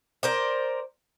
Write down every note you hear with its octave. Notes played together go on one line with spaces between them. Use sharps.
A#4 C5 D5